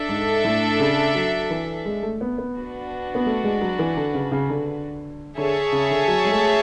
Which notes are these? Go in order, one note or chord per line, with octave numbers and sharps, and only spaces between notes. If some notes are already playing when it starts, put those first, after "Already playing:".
Already playing: D4 A4 E5
G#2
A2
C#3
F#3
E3
G#3
A3
B3
B3
D4 F#4 B4
B3
A3
G#3
F#3
E3
D3
C#3
C#3
D3
D3 G#4 C#5 E5 A5
C#3
D3
F#3
G#3
A3